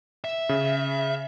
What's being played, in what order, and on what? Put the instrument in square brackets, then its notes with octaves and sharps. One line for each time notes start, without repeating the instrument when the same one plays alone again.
[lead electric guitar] E5
[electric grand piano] C#3